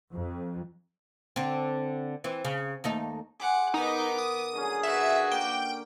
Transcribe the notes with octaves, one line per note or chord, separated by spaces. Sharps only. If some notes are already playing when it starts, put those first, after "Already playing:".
F2
D3 C4
E3 C4
C#3
D#2 A3 D#4
G#4 F#5 C6 D6
D#3 B3 D#4 D6
D#6
D3 F#3 C#4 G#4
F#4 B4 E5
A#3 G5